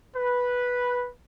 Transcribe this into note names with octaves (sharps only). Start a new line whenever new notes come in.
B4